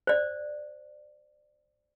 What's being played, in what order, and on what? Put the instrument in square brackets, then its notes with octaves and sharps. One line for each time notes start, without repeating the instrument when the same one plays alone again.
[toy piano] C5 D5